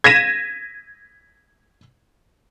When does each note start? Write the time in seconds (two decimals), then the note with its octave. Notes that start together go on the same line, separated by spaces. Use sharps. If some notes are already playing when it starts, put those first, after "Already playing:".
0.04 G#6 A#6 B6 D#7 E7